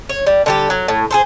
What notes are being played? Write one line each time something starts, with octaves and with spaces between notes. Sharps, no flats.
C#5
G3
D3 G3 G4
F#3
A2
G#4 A4 C5